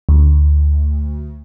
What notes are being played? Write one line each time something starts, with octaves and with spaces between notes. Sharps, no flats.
D2